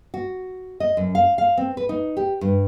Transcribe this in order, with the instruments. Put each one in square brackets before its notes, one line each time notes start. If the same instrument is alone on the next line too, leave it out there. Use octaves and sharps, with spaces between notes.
[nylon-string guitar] F#4
D#5
F#2
F5
F5
C4
B4
D#4
G4
G2